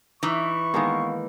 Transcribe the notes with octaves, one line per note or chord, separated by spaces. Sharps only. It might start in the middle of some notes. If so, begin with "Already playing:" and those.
E3 D#4 E5 C#6
D#3 G#3 A#3 B3 F5